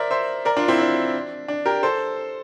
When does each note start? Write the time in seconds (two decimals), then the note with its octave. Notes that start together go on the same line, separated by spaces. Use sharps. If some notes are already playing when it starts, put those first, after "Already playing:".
Already playing: A#4 C5 D5 E5
0.11 C5 E5
0.45 A#4 D5
0.57 D4 F4
0.68 C4 E4
0.79 D4
1.48 D4
1.66 G4 A#4
1.83 A4 C5